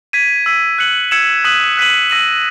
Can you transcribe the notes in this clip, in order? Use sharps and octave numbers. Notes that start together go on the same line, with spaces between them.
G#6 B6 D#7
E6 B6 D#7
F#6 C#7 F#7
E6 G#6 C#7 E7
D#6 F#6 B6 D#7 F#7
F#6 B6 D#7 F#7
E6 A#6 D#7 F#7